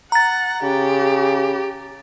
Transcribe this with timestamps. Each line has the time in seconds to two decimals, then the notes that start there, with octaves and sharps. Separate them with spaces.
0.12 F#5 A#5 A6
0.63 C#3 G4